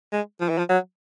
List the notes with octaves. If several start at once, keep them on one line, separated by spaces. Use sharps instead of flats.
G#3
F3
E3
F3
F#3